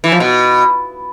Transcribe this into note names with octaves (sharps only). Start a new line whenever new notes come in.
E3
F3
B2